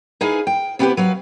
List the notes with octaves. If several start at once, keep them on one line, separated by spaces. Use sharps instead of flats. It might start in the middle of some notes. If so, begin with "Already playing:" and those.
D#4 E4 G#4 B4 F5 G#5
G5
C3 B3 E4 F#4 G4 B4
F#3 B4 F5